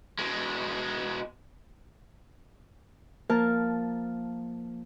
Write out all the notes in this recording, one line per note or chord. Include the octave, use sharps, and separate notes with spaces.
B2 G#3
F3 A#3 A#4 F5 A5